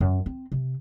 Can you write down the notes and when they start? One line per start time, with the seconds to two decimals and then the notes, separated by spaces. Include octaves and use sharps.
0.01 F#2
0.26 C4
0.52 C3